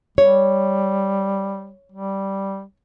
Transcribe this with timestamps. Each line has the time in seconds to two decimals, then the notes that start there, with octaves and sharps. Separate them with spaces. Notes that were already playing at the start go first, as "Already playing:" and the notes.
0.18 G3 C#5
1.92 G3